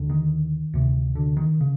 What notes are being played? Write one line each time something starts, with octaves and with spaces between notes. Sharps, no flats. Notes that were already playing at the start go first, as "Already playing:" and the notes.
Already playing: D#2 D3
D#3
D2 C3
D3
D#3
C#3